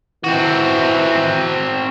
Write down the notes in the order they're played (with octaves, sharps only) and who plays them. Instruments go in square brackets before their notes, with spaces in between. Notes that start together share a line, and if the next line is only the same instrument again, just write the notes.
[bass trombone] E3 [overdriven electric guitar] C4 F#4